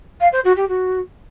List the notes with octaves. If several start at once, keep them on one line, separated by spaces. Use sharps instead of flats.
F5
C5
F#4
G4
F#4